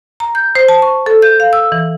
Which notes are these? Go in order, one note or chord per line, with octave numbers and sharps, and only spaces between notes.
A#5
G6
C5
A5
C#6
A4
G6
F5
E6
E3